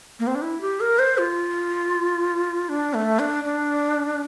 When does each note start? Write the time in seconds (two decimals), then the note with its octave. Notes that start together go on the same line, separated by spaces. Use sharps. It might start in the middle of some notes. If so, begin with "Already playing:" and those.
0.20 A#3
0.27 C4
0.35 D4
0.42 E4
0.61 G4
0.80 A#4
0.99 C5
1.18 F4
2.69 D4
2.94 A3
3.19 D4
3.44 D4